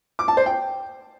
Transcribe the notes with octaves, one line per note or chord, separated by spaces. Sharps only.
D6
A5
C5
G5